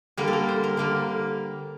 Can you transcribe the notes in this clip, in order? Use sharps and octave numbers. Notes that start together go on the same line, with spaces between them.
D3 G3 A#3 A#4
A4
A#4
C5
A#4
D3 G3 A#3 A#4